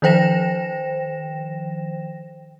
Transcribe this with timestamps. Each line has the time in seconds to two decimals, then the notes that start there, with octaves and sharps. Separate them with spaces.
0.02 D#3 F3 C5 G5 A#6 E7